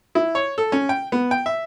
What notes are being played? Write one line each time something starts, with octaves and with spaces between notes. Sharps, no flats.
E4
C#5
A4
C#4
G5
B3
G5
E5